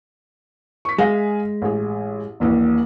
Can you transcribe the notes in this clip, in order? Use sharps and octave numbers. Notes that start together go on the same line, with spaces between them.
C#6 B6
G#3 G#4 E5 F5
A1 G#4
D#1 A#1 E3